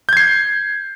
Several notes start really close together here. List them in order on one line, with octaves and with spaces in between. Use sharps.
G6 G#6 C7